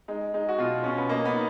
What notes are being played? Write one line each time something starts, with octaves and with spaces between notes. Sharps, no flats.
G#3 D#4
G#3 D#4
F#4
B2 F4
B2 C#4
B3
A#3 D#5
B3
D#4